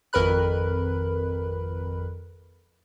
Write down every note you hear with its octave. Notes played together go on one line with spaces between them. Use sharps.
G#1 F2 A#4 B4 B5 F#6